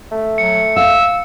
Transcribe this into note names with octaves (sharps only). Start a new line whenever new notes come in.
A3
F#3 C#7
F5 E6